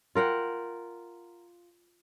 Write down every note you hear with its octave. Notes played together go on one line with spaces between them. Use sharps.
F4 A#4 F#5 G5